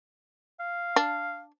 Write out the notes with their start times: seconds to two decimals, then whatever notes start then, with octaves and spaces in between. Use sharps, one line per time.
0.60 F5
0.96 D4